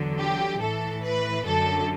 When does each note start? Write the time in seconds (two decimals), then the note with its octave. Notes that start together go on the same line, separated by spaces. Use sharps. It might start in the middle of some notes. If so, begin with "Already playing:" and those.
Already playing: E2 D3 F#3
0.19 G4
0.61 A2 E3 A4
1.04 B4
1.45 F#2 D3 F#3 A4